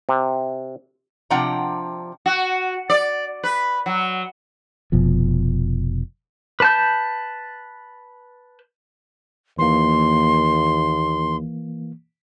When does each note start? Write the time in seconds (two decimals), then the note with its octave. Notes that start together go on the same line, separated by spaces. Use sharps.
0.09 C3
1.30 C3 F3 D4 F#5 G5 A#5
2.26 F#4
2.90 D5
3.44 B4
3.86 F#3
4.92 F1 B2 F3
6.60 B4 A5 G6
9.59 D#2 E3 A#3 C6